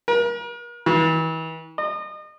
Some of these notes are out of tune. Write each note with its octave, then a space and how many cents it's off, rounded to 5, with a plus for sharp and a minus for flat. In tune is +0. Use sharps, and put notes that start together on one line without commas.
A#4 +40
E3 -40
D#5 -35